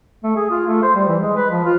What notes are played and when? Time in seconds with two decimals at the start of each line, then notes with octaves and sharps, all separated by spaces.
0.23 A3
0.36 G#4
0.50 F4
0.67 A3
0.82 C5
0.95 G3
1.08 E3
1.21 G#3
1.36 B4
1.50 F3
1.65 F4